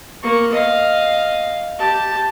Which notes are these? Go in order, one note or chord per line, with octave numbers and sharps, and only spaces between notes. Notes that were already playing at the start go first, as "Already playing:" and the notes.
A#3 C#6
D#5 F5
G4 A5